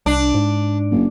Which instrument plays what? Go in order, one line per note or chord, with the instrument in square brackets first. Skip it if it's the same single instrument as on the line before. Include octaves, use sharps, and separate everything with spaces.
[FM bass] C2 [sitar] D4
[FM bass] G#2
[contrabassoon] F#1